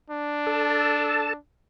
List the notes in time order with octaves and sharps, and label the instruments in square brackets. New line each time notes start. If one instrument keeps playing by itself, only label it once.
[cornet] D4
[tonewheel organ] A4 A5